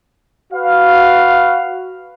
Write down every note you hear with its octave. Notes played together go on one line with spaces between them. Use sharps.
F#4 B4 F5